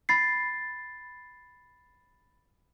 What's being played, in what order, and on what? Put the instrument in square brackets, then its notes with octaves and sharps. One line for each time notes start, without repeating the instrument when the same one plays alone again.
[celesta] B5 A6 C7